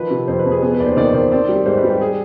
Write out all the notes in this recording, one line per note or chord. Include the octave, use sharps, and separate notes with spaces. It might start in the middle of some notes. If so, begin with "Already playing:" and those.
Already playing: D#3 F3 B4
C3
F2 C5
B4
F2
G#4
B3 G#4
B4
D#2 D5
C5
D#3 D5
D#3 C5
C4 D5
G3
G#2 C5
B4
G3
G4
G#4